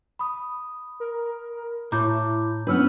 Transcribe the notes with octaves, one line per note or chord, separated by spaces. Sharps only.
B5 D#6
A#4
A2 E4 A#5 D6 G6
B3 C#4 D4 B4 E6 F6